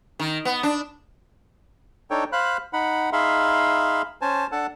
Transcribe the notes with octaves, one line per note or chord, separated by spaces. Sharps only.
D#3
B3
D4
D4 D#4 A4 C#5 G5
C5 F5 B5 F#6
D#4 F#5 B5
D#4 G#4 E5 F5 B5 C6
C#4 C5 G#5 A5
D4 A4 F#5 A5